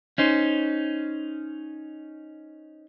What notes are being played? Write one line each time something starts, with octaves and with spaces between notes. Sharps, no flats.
C#4 D#4 C5